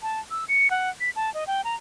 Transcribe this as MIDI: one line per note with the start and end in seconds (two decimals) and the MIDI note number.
0.02 0.20 81
0.31 0.45 88
0.48 0.70 97
0.71 0.90 78
1.00 1.10 95
1.16 1.33 81
1.34 1.44 75
1.47 1.61 79
1.64 1.75 82